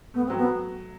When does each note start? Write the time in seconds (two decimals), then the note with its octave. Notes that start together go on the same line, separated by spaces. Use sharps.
0.14 A3 B3
0.26 C4
0.30 F#3
0.37 B3